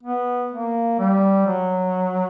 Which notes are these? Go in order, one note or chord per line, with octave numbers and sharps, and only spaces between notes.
B3
A#3
G3
F#3